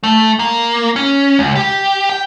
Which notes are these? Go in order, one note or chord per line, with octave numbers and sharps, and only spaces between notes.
A3
A#3
C#4
C#2
G4
G5